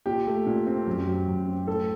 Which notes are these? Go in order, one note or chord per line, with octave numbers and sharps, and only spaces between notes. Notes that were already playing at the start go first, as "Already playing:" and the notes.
A#2 G4
A3
A#2
C4
F#2
F#3
F#2
C4
A2 A4